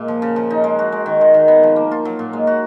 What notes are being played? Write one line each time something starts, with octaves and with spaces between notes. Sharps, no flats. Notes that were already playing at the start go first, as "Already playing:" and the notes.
Already playing: A#2 G#3 A#3
F3
C#3
F3
D#4
G#3
F#4
G#3
D#3
G#3
D#3
B3
F3
A#3
F4
F#3
A#2
G#3
F#4